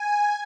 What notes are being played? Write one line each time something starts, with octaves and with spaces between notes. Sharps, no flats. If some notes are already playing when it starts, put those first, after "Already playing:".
Already playing: G#5